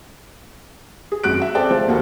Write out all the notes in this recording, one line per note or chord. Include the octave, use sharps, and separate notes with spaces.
G#4
G#1 F#2 F#4 F#6 D7
E5
C4 G#4 A4 D5 G5
F3
D#2 A#3 F#4 A4